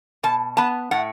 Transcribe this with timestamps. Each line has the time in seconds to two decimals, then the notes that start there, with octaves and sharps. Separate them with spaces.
0.23 B2 A5
0.57 B3 A5
0.91 A2 F#5